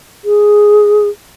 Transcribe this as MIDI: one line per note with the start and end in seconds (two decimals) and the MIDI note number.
0.25 1.08 68